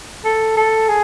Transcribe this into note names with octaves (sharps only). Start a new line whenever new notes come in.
A4
A4
G#4